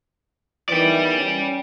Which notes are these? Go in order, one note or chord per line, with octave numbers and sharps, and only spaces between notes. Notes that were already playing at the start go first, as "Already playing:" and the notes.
E2 D#3 E3 D5 G5
C#4